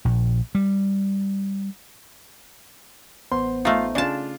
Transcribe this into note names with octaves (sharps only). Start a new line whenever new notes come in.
A#1
G3
A1 B3 C5 C6
A3 D#4 F4 F5
C#3 D4 F4 A5